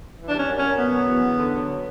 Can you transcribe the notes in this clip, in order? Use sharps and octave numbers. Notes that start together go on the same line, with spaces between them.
E3
D4
G3
C#4
F#2
F#2 C#4
B2 B3
F#3
E2
E2
D3
F#3